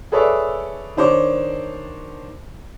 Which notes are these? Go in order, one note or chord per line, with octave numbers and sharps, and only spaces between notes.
G#4 A4 B4 C#5 D5 E5
D#3 D4 C5 C#5 D6